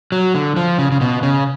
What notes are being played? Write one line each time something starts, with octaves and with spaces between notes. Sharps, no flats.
F#3
D3
F3
C#3
C#3
B2
C#3